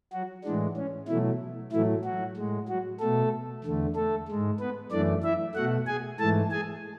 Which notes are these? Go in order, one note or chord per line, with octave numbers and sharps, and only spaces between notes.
F#3 F#4
A2 E3 G#3 D4
C#4
B2 E3 F#3 A3 E4
A2 E3 F#3 A3 E4
F#3 F#4
A2 G#3
F#3 F#4
B2 A3 A4
E2 D3 A3
A3 A4
G#2 G#3
B3 B4
F#2 E3 A3 D4 D5
E4 E5
B2 A3 F#4 F#5
G#4 G#5
G#2 E3 A3 A4 A5
G#4 G#5